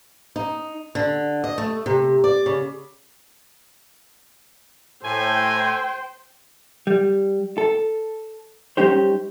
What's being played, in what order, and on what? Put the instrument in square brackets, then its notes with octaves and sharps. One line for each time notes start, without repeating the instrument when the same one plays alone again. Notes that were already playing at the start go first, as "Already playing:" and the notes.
[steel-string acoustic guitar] D#4
D3
D#5
A3
C3
D5
C#3
[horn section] A2 G#5 [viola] C5 G5
[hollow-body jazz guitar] G3
A4
G3 C#4 D#4 G4 C5